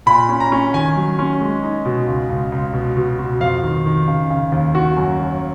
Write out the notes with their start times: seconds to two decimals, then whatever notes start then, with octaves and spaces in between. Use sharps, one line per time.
0.06 A#2 B5
0.29 C#4
0.40 A#5
0.52 C#4
0.74 D#3 G#5
0.96 F#3
1.19 C#4
1.41 G#3
1.63 D#4
1.85 B2
2.07 C#2
2.29 C#2
2.52 C#2
2.74 B2
2.97 B2
3.19 B2
3.40 F2 F5
3.63 D#3
3.85 D#3
4.08 C#3
4.30 C#3
4.52 D#2
4.74 D#3 F#4
4.97 F#2
5.19 F#2